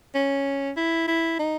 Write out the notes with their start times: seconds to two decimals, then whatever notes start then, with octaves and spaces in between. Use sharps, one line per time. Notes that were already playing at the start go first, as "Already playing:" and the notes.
0.15 C#4
0.77 E4
1.08 E4
1.39 D#4